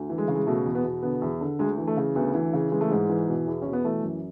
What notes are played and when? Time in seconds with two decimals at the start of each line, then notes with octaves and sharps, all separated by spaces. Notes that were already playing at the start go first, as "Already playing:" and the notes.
Already playing: D2
0.10 E3
0.18 G#3
0.28 C#3
0.35 G#3
0.47 B2 A3
0.65 E2
0.75 B3
0.84 B2
1.03 D3 B3
1.22 E2
1.41 D3
1.59 D2 G#3
1.78 E3
1.87 A3
1.97 C#3
2.15 D2 B3
2.35 E3
2.53 C#3
2.72 E3 G#3
2.81 A3
2.88 G#2 G#3
3.10 E3
3.28 B2
3.47 E2
3.62 B2 C#4
3.73 B3
3.84 E3 A3
4.03 F#2